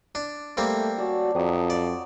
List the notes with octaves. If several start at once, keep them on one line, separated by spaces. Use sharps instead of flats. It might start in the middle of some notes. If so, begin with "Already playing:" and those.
D4
G3 A3 A#3 C4
C#4 F#4 D5 A5
F2 F#3 C4 D#6
D5